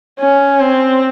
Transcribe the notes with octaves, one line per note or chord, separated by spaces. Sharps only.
C#4
C4